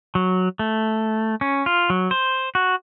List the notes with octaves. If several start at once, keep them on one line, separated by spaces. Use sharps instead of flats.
F#3
A3
C#4
F4
F#3
C5
F#4